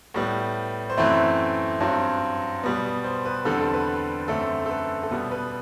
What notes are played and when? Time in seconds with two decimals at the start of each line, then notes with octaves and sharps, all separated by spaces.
0.14 A2 G3 B3
0.90 C5
0.97 F#2 E3 A3 C4 B4
1.80 G2 F#3 C4
2.64 B2 G3 B3
3.04 C5
3.25 B4
3.45 E2 D3 G3 C4 A4
3.60 A4
3.74 B4
4.28 F#2 D3 A3 C4 A4
4.66 A4
4.69 B4
5.03 A4
5.11 B2 G3 B3 B4
5.31 B4